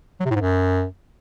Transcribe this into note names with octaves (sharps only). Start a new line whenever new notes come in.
F#3
C3
A2
G#2
F#2